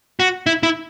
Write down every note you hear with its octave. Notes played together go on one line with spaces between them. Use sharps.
F#4
E4
E4